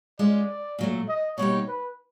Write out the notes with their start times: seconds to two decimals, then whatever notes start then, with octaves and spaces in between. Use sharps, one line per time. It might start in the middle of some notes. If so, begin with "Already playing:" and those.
0.19 G#3 C#4 F4 D5
0.79 A#2 F#3 A3
1.09 D#5
1.38 B2 G3 A#3 D#4 G4 C#5
1.68 B4